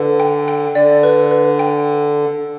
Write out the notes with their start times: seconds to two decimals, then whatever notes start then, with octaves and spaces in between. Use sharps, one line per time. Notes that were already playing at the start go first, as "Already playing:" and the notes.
Already playing: D3 B4
0.20 G5
0.48 G5
0.75 D3 D5
1.03 B4
1.31 B4
1.59 G5